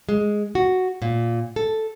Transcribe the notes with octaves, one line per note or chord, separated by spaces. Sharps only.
G#3
F#4
A#2
A4